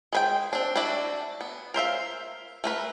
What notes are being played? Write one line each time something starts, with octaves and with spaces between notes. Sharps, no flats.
G#3 B4 G5
C4 D4
D4 E4 F#4 D5 E5
B3
A#4 C5 E5 F5
A3 A#4 B4